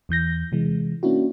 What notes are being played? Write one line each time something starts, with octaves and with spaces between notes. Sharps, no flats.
E2 E3 G6 A#6
C3 E3 G#3
A#3 C#4 D4 E4 F#4